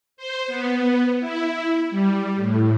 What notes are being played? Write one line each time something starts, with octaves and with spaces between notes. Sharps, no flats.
C5
B3
E4
G3
A2